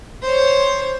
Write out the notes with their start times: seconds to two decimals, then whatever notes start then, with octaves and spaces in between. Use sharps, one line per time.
0.23 C5 C#5